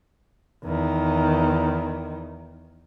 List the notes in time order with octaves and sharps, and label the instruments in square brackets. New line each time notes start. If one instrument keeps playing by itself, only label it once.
[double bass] E2 D#3